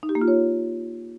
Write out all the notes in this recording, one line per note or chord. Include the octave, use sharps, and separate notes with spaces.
D#4
G4
A#3
F4
C#5